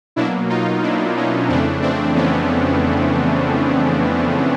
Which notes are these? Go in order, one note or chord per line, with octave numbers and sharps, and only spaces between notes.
B2 F#3 A#3 D4 E4
D#4 F4
D4 E4
C#4 D#4
F2 C#3 E3 A3 C4 D4
C4 D4
B3 C#4